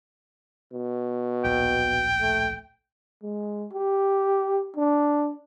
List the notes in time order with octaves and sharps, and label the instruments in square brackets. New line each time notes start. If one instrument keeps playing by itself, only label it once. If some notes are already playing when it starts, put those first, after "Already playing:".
[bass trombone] B2
[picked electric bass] D1 A#1 [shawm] G5
[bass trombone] A3
[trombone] G#3
G4
D4